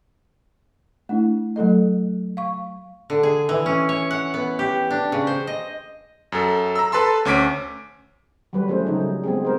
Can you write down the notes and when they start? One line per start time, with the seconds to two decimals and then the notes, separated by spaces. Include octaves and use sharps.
1.09 A3 D4 E4
1.56 F#3 A3 A4 D#5
2.37 F5 C#6
3.10 D3
3.23 G#4
3.49 E3
3.66 C#4
3.89 C#5
4.11 F#5
4.34 B3
4.59 G4
4.91 D4
5.12 C#3
5.27 C5
5.47 D#5
6.32 F#2 A4
6.76 A#5 E6
6.92 A4 B4 A5 C6 E6
7.25 D2 C#4 D6 B6 D7
8.53 F#3 G3 B4
8.68 F3 G3 A3 C#4 G#4 C5
8.86 C#3 F#3 C#4 D#4 G#4 A4
9.00 G3
9.24 G#3 B3 C4 G4 G#4
9.45 A#4 C5